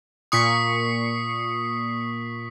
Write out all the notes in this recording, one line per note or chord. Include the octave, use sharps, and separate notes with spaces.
A#2 C#6 D#6 B6 C7